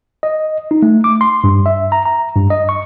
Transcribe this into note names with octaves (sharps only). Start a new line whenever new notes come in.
D#5
D#4
A3
D6
C6
G2
E5
A#5
A#5
G2
D#5
C#6